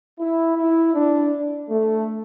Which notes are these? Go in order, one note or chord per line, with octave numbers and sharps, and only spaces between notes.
E4
E4
D4
A3